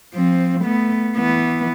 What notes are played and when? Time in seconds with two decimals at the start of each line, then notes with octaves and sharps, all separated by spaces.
0.14 F3 C4
0.61 A3 B3
1.16 E3 B3